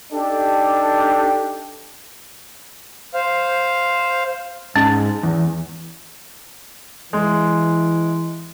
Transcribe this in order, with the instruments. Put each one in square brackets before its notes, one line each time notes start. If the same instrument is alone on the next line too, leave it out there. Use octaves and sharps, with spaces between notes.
[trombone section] D4 D#4 G4 A4
[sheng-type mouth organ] C5 F5
[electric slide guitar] G#2 [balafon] C#4
[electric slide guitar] E2
[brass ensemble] E3 [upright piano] G#3